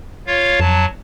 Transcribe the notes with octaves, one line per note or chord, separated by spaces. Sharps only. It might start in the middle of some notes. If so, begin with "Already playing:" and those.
F4 C#5 F5
F2 F#3 A5